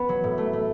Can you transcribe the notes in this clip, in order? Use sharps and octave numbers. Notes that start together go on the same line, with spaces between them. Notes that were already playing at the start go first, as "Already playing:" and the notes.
Already playing: B3
F#3
A2
A3
A3